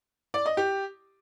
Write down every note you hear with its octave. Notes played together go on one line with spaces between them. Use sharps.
D5
D#5
G4